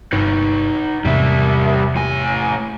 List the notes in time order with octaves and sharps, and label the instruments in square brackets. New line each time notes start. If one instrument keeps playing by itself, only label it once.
[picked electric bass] G1 [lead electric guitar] D#4 B4
[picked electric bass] E2 G#2 C3 [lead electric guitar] G3 E5
[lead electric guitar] A2 G#5